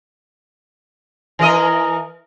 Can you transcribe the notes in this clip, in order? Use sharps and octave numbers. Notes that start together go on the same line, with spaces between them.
E3 A#4 D#5